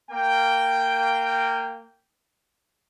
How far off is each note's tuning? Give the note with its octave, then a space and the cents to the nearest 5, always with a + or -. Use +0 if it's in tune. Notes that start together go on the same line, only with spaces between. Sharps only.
A#3 -20 G5 +0